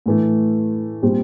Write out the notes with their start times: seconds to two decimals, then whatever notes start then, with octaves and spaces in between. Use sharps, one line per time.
0.06 A2 E3 A3
1.02 A#2 G3 C4